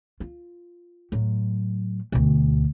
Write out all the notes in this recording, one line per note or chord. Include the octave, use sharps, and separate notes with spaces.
F4
A2 F#3
D2 B2